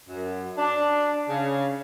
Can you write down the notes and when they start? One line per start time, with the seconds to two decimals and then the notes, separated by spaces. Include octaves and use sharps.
0.09 F#2
0.58 D4
1.29 C#3